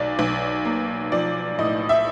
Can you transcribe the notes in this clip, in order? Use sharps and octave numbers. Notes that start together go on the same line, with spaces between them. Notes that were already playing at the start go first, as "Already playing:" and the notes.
Already playing: B1 D5
B1
A#3
F3 D5
A2 D#5
E5